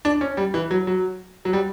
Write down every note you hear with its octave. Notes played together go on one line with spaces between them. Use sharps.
D4
C#4
G3
E3
F#3
F#3
F#3
G3